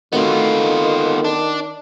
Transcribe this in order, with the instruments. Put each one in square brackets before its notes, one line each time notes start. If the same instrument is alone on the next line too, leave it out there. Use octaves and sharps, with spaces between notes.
[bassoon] D#3 [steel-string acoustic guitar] A3 C4 F#4 [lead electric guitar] B3 F4
[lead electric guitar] D4